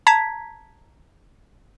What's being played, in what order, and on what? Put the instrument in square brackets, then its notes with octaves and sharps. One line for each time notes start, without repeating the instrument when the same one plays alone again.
[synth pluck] A5 A#5 G#6 B6